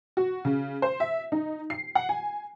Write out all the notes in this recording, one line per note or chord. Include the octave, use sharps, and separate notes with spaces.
F#4
C#3
C5
E5
D#4
C7
F#5
G#5